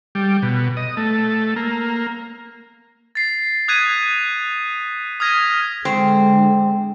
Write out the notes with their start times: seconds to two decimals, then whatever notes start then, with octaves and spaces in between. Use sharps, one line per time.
0.15 G3
0.42 B2
0.77 D#5
0.97 A3
1.56 A#3
3.15 A6 C7
3.68 D#6 F#6 G#6 B6 D#7
5.20 D#6 F6 G#6 A#6 B6 D#7
5.85 D3 G#3 C4